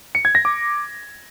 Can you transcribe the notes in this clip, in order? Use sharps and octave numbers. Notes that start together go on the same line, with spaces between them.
C#7
G#6
A#6
D6